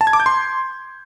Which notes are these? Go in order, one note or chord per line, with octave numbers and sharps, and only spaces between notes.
A5
G#6
D6
G6
C6